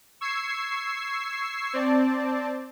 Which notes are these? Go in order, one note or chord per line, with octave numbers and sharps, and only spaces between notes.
C#6 E6 G#6 C7
C4 D5 A5